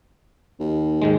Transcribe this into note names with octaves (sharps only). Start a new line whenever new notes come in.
D#2
G#2 D#3 G#3